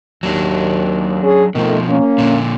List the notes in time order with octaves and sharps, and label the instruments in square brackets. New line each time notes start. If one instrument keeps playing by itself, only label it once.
[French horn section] D#2 [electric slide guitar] F#3 D4
[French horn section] C#4 G#4
[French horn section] F2 D#3 A3 [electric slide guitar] B2 F3
[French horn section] A#3 C#4
[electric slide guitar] A#2 D3